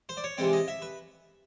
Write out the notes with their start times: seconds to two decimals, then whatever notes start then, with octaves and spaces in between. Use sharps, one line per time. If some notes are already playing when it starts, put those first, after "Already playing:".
0.09 C5
0.17 D5
0.24 C#5
0.37 C3 E3 G#3 C4 D5
0.53 D#5
0.68 E5
0.82 B4